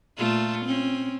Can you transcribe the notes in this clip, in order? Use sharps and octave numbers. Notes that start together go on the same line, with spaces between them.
A#2 A3 F4
C4 C#4